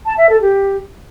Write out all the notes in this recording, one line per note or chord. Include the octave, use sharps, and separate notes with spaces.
A5
E5
A4
G4